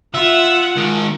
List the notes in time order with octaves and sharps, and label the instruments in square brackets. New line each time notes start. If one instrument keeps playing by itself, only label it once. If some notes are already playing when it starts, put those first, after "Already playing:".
[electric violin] F4 F#5 [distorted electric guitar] E5
[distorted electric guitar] G#2 D#3